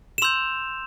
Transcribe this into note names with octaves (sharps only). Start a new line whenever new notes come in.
E7
C6 E6 G6 F7